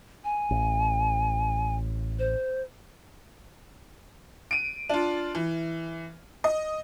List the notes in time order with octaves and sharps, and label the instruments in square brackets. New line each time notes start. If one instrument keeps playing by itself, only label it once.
[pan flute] G#5
[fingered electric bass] A1
[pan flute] C5
[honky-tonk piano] D7 D#7
D4 F4
E3
D#5